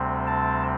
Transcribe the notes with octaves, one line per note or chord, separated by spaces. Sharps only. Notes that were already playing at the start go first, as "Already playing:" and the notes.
Already playing: D2 C3 G3 C4
A5